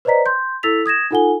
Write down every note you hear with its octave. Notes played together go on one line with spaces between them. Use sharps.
B4 C5 D5 D#5 A#5 B6
C6 G6
E4 A4 E6 A6 B6 F7
D#6 G#6 A#6 E7
D#4 F4 A4 F#5 G#5 G7